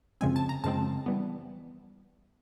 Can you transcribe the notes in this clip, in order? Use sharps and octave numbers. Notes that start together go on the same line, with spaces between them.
F#2 C#3 F3 G#3 C4 G#5
A5
A#5
F#2 C#3 F3 G#3 C4 A5
E3 G3 B3